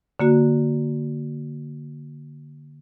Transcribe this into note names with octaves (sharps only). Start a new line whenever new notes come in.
D3 A#3 F#4